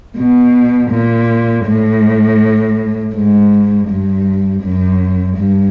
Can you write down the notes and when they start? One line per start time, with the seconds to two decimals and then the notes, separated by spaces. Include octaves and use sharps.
0.17 B2
0.90 A#2
1.65 A2
3.14 G#2
3.88 G2
4.62 F#2
5.37 G2